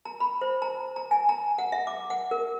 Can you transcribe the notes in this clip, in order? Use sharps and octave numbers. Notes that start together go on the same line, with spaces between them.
A#5
B5
C5
A#5
A#5
G#5
A#5
F#5
E5
D6
F#5
A#4